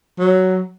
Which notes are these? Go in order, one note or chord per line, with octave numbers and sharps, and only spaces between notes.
F#3